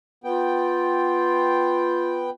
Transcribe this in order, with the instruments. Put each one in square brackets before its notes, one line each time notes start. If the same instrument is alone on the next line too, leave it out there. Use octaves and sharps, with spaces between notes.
[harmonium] B3 G5 [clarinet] F4